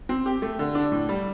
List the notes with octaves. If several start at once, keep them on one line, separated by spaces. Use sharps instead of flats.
C4
G4
A3
D3
D4
A2
G3